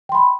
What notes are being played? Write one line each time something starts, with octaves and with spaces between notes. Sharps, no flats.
G5 B5 C6